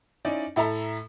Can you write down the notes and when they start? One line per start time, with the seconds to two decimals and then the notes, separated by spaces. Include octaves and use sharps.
0.25 C#4 D#4 E4 D5
0.56 A2 E4 A4 E5 A#5